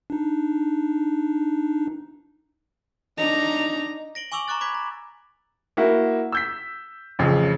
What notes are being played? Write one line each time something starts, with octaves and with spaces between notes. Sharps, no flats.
D4 D#4
D4 D#4 A#5
A#6 D7 F#7 G7
G#5 C#6 D6 E6 F7 F#7
A#5 C#6 D6 F#6 A6
B5 D6 G#6 B6
A#5
A#3 E4 F#4
E6 G6 B6
A1 F2 C#3